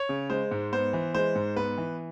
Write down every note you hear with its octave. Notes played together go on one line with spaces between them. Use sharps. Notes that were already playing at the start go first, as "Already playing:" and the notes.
Already playing: C#5
C#3
G#3 C5
G#2
B3 C5
E3
G#3 C5
G#2
B3 B4
E3